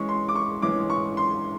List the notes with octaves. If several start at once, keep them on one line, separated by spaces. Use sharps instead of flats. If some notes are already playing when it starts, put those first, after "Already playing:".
Already playing: E3 G#3 C#4 C#6
C6
D6
C#6
E3 G#3 C#4 D6
C#6
C6